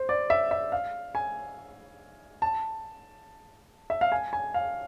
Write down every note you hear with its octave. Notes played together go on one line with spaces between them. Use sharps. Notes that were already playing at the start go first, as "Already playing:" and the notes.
Already playing: C5
D5
E5
E5
F5
G#5
A5
E5
F5
G#5
G#5
F5